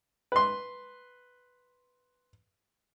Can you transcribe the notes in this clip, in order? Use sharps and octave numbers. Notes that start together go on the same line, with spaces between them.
B4 C6